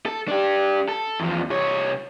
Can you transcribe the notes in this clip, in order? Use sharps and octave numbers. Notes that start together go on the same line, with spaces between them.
A4
D4 G4
A4
E2 F3
C2 C#5